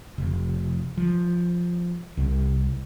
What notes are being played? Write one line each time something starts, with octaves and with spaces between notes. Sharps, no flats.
F1
F3
C2